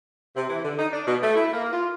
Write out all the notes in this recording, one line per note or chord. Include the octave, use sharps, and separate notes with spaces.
C3
E3
D3
D#4
D4
B2
A3
E4
A#3
F4